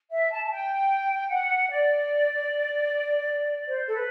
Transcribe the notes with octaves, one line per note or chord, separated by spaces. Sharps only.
E5
A5
A5
G5
F#5
D5
C5
A4
B4